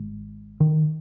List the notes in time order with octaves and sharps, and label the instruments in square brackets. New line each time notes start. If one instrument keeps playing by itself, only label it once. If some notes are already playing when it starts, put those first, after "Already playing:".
Already playing: [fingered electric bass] G#1 G#2
D#3